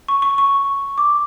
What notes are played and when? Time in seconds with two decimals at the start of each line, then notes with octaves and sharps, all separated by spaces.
0.08 C#6
0.22 C#6
0.38 C#6
0.98 D6